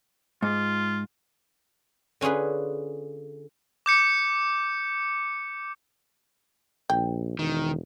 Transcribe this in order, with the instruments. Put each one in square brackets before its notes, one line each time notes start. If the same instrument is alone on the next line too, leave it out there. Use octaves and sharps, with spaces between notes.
[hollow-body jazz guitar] G#2 [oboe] F4
[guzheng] D3 C#4 F4 G#4 B4
[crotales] D6 G6 C#7
[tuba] A#1 [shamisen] G5
[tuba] E1 [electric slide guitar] D#3